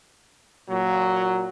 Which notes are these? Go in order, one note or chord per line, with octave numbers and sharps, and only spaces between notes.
A#2 F#3